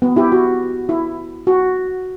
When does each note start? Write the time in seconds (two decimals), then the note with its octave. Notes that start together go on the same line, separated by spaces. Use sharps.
0.02 B3
0.16 E4 G4
0.32 F#4
0.89 E4
1.47 F#4